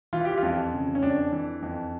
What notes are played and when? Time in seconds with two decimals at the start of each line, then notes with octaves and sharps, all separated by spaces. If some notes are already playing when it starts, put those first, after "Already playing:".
0.13 E3 F4
0.25 G4
0.38 F2 F4
0.72 C#3
0.95 C#4
1.03 F2 D4
1.32 E3
1.62 F2